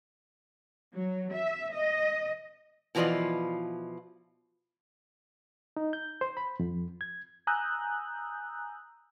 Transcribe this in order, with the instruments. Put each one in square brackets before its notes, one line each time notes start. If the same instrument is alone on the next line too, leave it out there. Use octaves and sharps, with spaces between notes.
[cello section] F#3
E5
D#5
[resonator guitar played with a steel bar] B2 E3 F3 F4 D5 D#5
[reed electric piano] D#4
G6
C5
B5
F2
G#6
[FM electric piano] G#5 A#5 D#6 E6 F#6 G6